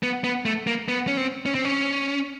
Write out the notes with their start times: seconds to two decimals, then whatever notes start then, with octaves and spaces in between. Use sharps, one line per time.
0.03 B3
0.24 B3
0.46 A3
0.67 A#3
0.88 B3
1.07 C#4
1.17 C4
1.46 C#4
1.55 C4
1.65 C#4